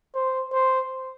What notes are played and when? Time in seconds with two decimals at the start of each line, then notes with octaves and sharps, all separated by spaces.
0.15 C5
0.53 C5